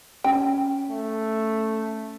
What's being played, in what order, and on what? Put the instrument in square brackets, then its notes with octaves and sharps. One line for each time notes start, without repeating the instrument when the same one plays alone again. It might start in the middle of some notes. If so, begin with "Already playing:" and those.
[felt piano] C#4 [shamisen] G5
[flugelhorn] A3